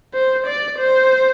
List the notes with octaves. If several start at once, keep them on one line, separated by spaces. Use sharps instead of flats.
C5
D5
C5